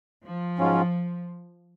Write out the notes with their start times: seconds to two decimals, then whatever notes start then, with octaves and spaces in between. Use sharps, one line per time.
0.24 F3
0.58 G#2 F#3 C#4 F4